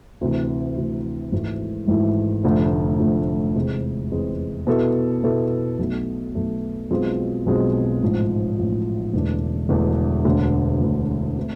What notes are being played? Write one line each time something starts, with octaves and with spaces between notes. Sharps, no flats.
D2 C3 E3
D2 C3 E3
G#1 G#2 E3 A3 E4
G#1 G#2 E3 A3 E4
F1 F2 D3 A3
F1 F2 D3 A3
E2 C3 G#3 C4
E2 C3 G#3 C4
B2 B3 E4 A4
B2 B3 E4 A4
B1 B2 A3
B1 B2 A3
B1 B2 G#3 C4 F4
B1 B2 G#3 C4 F4
A1 G#2 F3
A1 G#2 F3
E1 E2 D3 A3 D4
E1 E2 D3 A3 D4
E1 D2 D3
E1 D2 D3
A3 C4